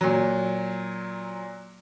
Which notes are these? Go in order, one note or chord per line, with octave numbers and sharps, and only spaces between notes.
A#2 F#3